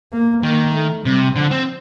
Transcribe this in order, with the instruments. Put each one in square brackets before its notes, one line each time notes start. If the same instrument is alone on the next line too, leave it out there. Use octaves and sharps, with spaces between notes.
[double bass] A#3
[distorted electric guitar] D#3 [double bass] A#3
[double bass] A3
[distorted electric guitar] C3 [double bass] G3
[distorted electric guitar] D3 [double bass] F3
[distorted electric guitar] C4